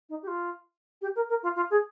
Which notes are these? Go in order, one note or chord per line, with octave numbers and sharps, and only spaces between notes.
D#4
G4
F4
G4
A#4
A#4
F4
F4
G#4